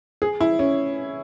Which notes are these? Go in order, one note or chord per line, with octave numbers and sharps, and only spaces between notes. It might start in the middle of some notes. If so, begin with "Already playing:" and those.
G#4
E4
C#4